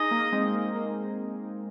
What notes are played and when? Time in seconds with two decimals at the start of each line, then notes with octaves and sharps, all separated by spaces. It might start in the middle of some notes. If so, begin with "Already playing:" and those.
Already playing: D#4 G#4 D#5
0.11 A#3
0.32 G#3 C4
0.55 A#3
0.76 A#3